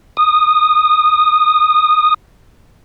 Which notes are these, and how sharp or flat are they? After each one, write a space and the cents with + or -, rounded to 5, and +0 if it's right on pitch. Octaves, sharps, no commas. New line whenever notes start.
D#6 -15